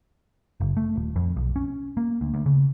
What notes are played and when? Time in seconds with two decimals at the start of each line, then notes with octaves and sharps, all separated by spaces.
0.60 F#1
0.77 A3
0.96 D#1
1.16 F2
1.36 B1
1.56 C#4
1.97 A#3
2.21 D2
2.34 D2
2.46 C#3